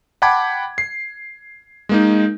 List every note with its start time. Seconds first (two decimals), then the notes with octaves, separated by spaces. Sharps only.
0.22 F#5 G5 A5 B5 D6 G#6
0.78 C7
1.89 G#3 A#3 D#4